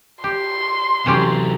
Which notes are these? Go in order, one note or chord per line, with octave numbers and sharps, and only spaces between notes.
G4 C6
C3 E3 F#3 C#4 G4